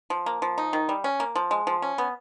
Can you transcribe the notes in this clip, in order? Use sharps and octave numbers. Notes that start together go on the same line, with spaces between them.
F3
A#3
F3
D#4
D#3
G3
C#4
A#3
F3
G#3
F3
C#4
B3